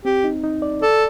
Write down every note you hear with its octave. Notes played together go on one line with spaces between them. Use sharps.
C4 G4
D#4
D#4
D5
A4 D5